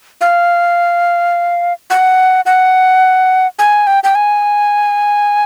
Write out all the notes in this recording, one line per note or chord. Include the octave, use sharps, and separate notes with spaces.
F5
F#5
F#5
G#5
G5
G5
G#5